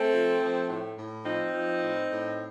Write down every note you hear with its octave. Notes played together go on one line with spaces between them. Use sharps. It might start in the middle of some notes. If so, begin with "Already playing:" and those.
Already playing: A3 C4
F3
F3
A2
A2
F3 C4 D#4
F3
A2
A2